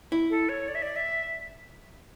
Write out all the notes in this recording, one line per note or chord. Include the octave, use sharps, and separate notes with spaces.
E4
A4
C#5
D5
E5
D5
E5